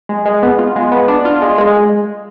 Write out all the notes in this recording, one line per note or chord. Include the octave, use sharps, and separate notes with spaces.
G#3
G#3
B3
F4
G#3
B3
D4
F4
G#3
G#3